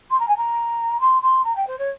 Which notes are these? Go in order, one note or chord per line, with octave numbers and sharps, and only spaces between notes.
C6
A#5
G#5
A#5
C6
C6
A#5
G5
C5
C#5